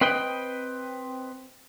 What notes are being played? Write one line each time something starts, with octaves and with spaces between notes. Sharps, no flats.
C4 B4 D#5 G5